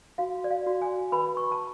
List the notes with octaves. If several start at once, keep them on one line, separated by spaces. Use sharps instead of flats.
F#4 F5
D5
F5
F#4
G#5
B4 B5
C#6
A5